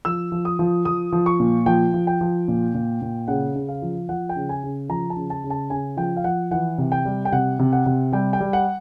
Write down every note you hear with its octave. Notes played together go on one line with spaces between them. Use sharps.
F3 E6
F3
D#6
F3
F3 D#6
F3
C#6
A#2
F3 G5
F3
G5
F3
A#2
A#2
A#2
C#3 F#5
C#3
F5
F3
F3 F#5
G5
C#3
G#5
C#3
F3 A#5
A5
C#3
A5
C#3
A5
C#3 G#5
F3 G5
F5
F3 F#5
E3 F#5
C3
G5
G3
G5
C3 F#5
C3
F#5
C3
G3 G5
G5
G3
F#5